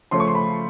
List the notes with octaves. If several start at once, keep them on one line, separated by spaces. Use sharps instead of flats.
C#3 F3 A3 C#4 C6
C#6
C6
B5